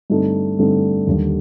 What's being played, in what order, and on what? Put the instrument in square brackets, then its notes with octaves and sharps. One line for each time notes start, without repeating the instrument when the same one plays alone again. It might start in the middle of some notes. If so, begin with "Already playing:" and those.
[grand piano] G2 D3 A3 C4 D#4
G2 D3 A3 C4 D#4
D#2 D3 G3